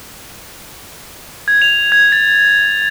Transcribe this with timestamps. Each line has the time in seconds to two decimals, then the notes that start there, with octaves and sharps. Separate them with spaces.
1.48 G#6
1.62 F7
1.92 G#6
2.12 A6